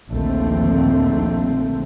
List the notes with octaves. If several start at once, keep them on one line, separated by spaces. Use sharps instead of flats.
A#1 D#2 D3 A3 C4